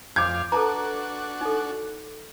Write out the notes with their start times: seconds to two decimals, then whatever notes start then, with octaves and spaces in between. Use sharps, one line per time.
0.16 F2 F5 D6 G6 G#6
0.52 D4 F#4 A4 B4 A5 A#5
1.41 D#4 A4